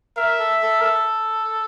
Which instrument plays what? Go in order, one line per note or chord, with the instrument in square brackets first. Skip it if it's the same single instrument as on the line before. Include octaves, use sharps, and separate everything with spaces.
[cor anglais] A#4 [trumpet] E5
[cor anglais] A4
A4
A#4
A4